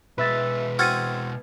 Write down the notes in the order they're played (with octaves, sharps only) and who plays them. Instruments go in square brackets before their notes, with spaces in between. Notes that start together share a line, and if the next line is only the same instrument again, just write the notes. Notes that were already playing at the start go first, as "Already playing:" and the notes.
[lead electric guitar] B2 G#3 [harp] B4 E5 A6
[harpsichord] C4 F#4 [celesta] F6 A6 C#7 [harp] G#6 D#7